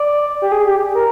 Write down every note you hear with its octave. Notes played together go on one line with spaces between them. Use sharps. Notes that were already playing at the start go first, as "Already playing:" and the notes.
Already playing: D5
G4
G#4
G4
A#4